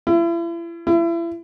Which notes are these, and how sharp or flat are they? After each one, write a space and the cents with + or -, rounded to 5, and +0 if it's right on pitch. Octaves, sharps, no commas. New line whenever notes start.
E4 +40
E4 +35